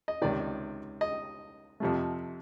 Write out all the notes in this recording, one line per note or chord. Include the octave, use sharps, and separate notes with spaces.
D#5
C#2 C3 D#3 D5
D#5
F2 C3 F3 A3